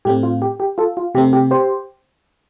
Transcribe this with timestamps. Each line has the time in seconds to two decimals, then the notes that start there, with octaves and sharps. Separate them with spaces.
0.05 A2 A3 C4 G4
0.23 F4
0.42 G4
0.60 G4
0.78 F4 A4
0.97 F4
1.15 C3 A3 C4 G4
1.33 G4
1.51 G4 C5